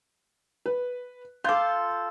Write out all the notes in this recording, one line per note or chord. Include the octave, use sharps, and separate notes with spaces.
B4
F4 A4 D6 G6